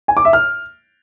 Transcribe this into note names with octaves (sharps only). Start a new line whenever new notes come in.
G#5
D6
E5
F6